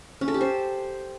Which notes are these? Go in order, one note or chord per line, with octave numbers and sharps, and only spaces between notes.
C#4
A4
G4
C5